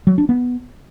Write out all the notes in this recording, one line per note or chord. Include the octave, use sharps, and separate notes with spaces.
F#3
D4
B3